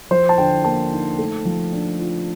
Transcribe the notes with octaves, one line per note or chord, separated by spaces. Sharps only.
F3 C5
A5
D3 G5
A#3 A5
D#4
A3
F3
D4
F4